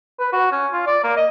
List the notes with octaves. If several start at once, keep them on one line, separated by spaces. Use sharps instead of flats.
B4
F#4
C#4
F4
D5
A#3
D#5